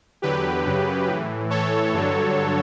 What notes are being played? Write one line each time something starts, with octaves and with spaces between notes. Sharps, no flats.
E2 D3 F#3 G4 B4
F#2 C#3 F#3
A2 E3
A2 E3 A4 C#5
G2 D3 F#3